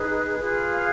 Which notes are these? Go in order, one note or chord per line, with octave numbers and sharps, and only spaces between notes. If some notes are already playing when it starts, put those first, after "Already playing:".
Already playing: D#4 G#4 B4
F4 G#4 B4
F5